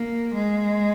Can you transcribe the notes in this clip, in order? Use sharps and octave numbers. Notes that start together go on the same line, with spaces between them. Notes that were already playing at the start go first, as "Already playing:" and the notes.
Already playing: A#3
G#3